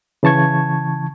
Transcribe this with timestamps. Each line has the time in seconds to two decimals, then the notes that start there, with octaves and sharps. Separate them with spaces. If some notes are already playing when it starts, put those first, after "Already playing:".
0.23 C#3 E3 A5 C#6 G#6